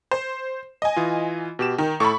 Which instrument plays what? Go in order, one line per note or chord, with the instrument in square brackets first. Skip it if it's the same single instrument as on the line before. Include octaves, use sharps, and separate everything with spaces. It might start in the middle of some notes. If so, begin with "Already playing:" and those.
[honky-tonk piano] C5
D#5 G#5
[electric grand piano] E3 F4
B2 G4 E7
[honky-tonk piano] D#3 [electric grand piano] G5
[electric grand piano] A2 A4 [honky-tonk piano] B5 C#6